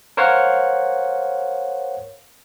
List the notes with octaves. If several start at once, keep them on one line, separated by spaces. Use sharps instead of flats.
A#4 C5 C#5 F5 F#5